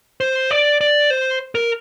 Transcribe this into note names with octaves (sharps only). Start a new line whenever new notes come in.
C5
D5
D5
C5
A#4